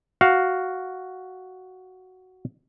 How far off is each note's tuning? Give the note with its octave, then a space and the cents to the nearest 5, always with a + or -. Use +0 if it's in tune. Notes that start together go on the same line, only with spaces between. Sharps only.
F#4 +5 F5 +5